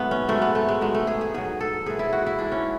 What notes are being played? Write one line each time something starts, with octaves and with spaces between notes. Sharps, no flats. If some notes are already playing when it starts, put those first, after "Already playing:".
Already playing: G#2 F#3 A3 B3
C#4
G#2 F#3 A3
B3
A3
G#3
G#2 F#3 G#3
A3
G#4
G#4
G#2 F#3 G#4
A4
G#2 E3 G#4
E4
F#4
E4
G#2 E3 D4
C#4